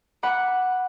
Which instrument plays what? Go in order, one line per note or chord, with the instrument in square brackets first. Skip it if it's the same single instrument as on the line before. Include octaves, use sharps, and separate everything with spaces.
[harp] F#5 B5 D6